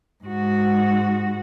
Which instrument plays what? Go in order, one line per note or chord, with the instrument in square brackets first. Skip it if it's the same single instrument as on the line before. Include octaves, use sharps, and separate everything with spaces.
[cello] G#2 F#4